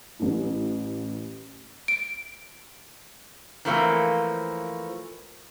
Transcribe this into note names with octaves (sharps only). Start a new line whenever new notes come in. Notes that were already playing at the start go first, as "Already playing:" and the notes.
A1 A2
D7
E3 F3 A3 A#3 C4